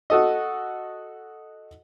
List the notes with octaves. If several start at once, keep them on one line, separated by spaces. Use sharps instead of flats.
F#4 A4 D#5